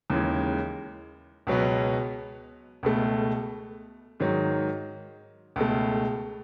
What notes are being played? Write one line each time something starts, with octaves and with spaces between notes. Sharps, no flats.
D#2 C#3 E3 G#3
C#2 B2 F#3 B3
C#2 B2 A3
G#2 D#3 F#3
C#2 B2 A3